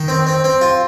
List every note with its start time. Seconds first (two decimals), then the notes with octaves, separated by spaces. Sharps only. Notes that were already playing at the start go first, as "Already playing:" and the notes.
Already playing: D#3
0.08 C4
0.27 C4
0.44 C4
0.61 F4